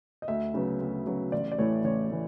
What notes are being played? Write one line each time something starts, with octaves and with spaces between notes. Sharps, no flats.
D#5
D2 E5
C#3 F#3 B3
D2
C#3 F#3 B3
A1 D5
D5
A2 E3 A3 C#5
A1 C#5
A2 E3